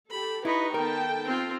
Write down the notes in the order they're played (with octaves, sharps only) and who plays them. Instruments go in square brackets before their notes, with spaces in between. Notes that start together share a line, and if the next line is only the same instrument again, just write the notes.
[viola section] G4 A4 [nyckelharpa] B5
[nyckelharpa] D#4 [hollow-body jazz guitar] E4 [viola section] B4 [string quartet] D#5 B5 C#6
[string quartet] D#3 B3 [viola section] A4 G5 A5 [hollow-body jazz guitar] A#4
[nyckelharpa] C4 F4